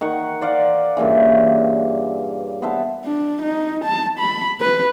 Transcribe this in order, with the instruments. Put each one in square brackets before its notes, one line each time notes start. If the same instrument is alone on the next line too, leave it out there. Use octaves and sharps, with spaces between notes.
[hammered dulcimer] D#3 F#5 C#6
C5 D5 F5 F#5
G2 A#2 C#3 E3
B3 C5 E5 A5
[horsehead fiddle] D4
D#4
A5
B5
B4